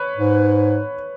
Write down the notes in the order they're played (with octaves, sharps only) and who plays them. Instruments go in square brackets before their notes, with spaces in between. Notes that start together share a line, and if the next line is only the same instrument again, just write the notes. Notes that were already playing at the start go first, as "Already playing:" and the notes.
Already playing: [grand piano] B4 C#5
[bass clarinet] G#2